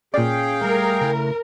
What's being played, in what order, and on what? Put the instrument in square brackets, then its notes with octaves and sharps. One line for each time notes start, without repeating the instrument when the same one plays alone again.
[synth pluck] A#2 D5 [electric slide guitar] C#4 [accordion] G#4 F5 G5
[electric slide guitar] G3 A3 [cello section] A#4
[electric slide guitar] C#3 A3 E4